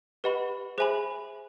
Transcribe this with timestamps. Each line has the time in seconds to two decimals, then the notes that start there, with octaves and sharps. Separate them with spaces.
0.24 G4 B4 D#5 F#5 B5
0.78 G#4 C5 E5 G#5 B5